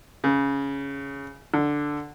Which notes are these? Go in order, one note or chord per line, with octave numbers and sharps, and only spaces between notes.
C#3
D3